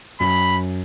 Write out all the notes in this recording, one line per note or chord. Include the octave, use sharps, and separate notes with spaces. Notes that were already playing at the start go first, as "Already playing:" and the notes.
F#2 B5